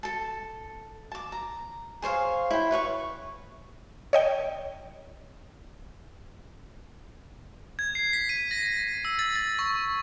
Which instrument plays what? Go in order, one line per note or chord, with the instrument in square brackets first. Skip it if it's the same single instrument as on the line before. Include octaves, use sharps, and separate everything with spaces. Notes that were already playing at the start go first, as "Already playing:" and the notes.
[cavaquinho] A4 A5
A5 D6
A#5
G#4 C5 C#5 F5
E4 G5
B4 C#5 F5 C#6
[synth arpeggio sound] C#5 D#5 G5
[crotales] G#6
C7
B6
D#7
A#6
E6
A6
A6
C#6